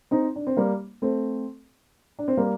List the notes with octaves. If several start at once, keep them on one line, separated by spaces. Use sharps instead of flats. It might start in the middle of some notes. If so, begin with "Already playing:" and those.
C4 D#4
D4
C4
G3 A#3
A3 C4
D4
C4
G3 A#3